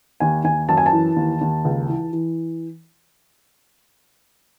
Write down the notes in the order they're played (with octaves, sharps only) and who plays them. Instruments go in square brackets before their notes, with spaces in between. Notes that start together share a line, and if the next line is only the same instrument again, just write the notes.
[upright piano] D#2 G#5
D#2 G#5
F#2 A5
G#5
A5
E3
D#2
D#2
C#2
E3
E3